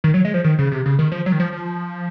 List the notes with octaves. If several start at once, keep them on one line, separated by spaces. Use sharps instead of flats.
D#3
F#3
G#3
F3
D#3
C#3
C3
C#3
D#3
F3
F#3
D#3
F3
F3